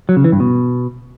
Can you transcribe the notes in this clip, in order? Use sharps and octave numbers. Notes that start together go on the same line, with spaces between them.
F#3
C#3
E3
G2
B2